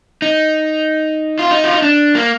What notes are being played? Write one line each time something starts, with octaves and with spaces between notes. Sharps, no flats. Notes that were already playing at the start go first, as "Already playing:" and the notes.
D#4
F4
D#4
F4
D#4
D4
A#3